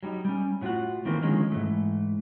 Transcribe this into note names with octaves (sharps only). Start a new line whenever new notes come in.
F#3 G3 C#4 D#4
G3 C#4
A2 B3 F4 F#4 F#5
D#3 E3 A3 A#3 C4
D3 D#3 F3 G#3 C#4
G#2 E3 A3